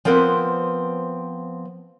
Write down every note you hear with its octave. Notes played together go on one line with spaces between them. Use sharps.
F3 B3 C4 A#4 B4